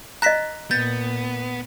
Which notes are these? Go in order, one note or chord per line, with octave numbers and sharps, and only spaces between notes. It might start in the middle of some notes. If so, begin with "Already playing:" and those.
D#5 A#5 F#6 A#6 B6
A#2 B3 G6 A6